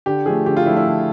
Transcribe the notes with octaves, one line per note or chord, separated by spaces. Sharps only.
D3 G4
F3 A3 G#4
D3 G4
F4
F3 A3 E4
E4
D3